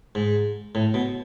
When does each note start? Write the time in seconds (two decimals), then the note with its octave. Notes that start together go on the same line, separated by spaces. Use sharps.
0.15 G#2
0.75 A2
0.94 B2